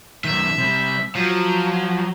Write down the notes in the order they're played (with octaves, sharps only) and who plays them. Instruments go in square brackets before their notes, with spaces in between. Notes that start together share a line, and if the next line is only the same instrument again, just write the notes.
[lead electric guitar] F#2 D#3 [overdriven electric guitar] E5
[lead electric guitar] C3 G3
[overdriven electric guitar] F3 [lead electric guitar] F#3